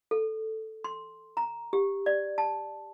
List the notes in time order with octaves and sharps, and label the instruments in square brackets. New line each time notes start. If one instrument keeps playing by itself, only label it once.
[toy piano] A4
C6
A#5
G4
D5
A5